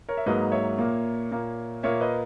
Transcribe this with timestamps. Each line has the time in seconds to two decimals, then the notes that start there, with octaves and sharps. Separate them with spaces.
0.09 A#4 C#5
0.17 E5
0.26 G#2 F#3 A#3 B4 D#5
0.52 C#5 E5
0.78 A#2 A#3
1.32 A#2 A#3
1.83 A#2 A#3 C#5 E5
2.00 B4 D#5